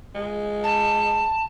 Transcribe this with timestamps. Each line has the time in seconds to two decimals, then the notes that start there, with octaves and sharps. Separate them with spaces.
0.15 G#3
0.63 A5